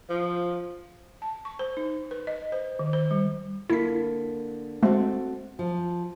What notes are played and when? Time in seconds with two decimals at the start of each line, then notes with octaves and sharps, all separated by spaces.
0.10 F3
1.22 A5
1.45 C#6
1.59 C5
1.77 D#4
2.11 B4
2.27 D#5
2.52 C5
2.79 D#3
2.93 C5
3.11 G3
3.70 D3 A#3 E4 B6
4.83 G#3 A3 C4 F#4 A4
5.59 F3